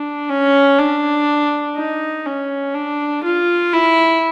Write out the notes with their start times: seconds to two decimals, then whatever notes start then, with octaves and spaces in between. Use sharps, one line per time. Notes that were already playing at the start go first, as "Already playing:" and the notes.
Already playing: D4
0.29 C#4
0.78 D4
1.76 D#4
2.26 C#4
2.74 D4
3.24 F4
3.73 E4